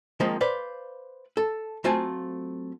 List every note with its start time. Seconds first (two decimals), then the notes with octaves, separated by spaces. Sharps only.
0.20 D#3 F3 G#3 A#3 C4
0.41 B4 C5 D5 F5
1.37 A4
1.84 F#3 A3 C4 F4 G#5 A5